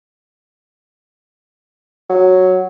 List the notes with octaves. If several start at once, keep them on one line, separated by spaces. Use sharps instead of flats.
F#3